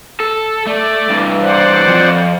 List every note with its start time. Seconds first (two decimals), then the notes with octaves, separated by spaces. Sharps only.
0.20 A4
0.67 A3 D5
1.10 G2 E3
1.41 C5 D5 F#5
1.88 F2